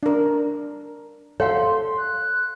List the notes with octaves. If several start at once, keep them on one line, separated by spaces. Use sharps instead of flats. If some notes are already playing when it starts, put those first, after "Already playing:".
D4 A#4
A4 C#5 F5 F#5 C6
F#6